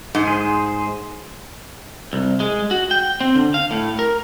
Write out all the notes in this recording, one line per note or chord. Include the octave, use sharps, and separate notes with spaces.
G#2
G#4 C5
C2
G#3
F#4
G5
C4
D3
F5
A2
A#4